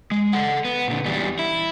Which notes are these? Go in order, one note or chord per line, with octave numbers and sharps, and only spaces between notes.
G#3
A4 F#5
B3
A#2 D3
E2 G3
E4